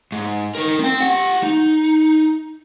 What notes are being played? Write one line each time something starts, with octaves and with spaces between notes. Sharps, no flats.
G#2
D#4 A#4
C4 G5
G4 F#5
D#4